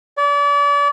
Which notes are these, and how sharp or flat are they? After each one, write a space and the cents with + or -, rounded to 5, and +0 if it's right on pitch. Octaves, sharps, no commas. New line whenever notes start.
D5 -35